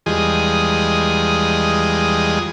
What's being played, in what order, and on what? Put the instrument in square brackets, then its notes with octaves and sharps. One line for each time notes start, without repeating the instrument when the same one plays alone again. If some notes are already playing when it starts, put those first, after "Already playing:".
[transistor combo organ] E2 F3 G3 G#3 G#4 D#5